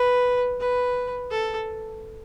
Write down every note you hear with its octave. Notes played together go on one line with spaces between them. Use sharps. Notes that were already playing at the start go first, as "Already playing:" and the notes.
Already playing: B4
B4
A4